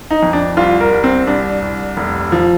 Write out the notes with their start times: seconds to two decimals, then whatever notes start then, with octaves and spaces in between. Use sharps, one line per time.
0.11 D#4
0.23 F2
0.33 D4
0.57 C2 F4
0.80 A#4
0.93 C2
1.04 C4
1.27 C2 D4
1.62 C2
1.97 F1
2.32 F3